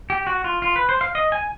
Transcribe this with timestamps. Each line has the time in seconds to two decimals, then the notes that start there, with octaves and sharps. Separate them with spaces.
0.10 G4
0.27 F#4
0.44 F4
0.62 F4
0.76 B4
0.89 C5
1.01 F5
1.15 D#5
1.32 G#5